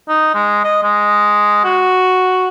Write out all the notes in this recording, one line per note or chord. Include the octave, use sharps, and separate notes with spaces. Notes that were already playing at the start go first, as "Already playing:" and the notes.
D#4
G#3
D#5
G#3
F#4